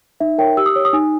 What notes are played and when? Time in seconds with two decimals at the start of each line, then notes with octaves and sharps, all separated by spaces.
0.20 D#4 E5
0.38 A#4 C#5 G5
0.57 G4 E6
0.66 D#6
0.76 C#5
0.85 D#6
0.93 D#4 G#5